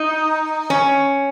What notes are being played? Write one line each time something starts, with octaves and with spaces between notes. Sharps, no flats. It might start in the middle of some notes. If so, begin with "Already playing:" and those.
Already playing: D#4
C#4